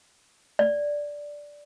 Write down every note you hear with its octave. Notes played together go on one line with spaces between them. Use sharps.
D5